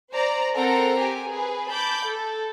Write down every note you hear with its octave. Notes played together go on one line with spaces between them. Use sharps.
C5 D5 A#5
C4 A4 A#4 F#5 A#5
G4 G#5
G#4 B4
A5 B5 D6 G6
A4